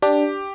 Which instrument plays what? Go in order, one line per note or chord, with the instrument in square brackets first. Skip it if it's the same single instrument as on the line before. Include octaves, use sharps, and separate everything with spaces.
[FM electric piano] D4 [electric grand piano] G4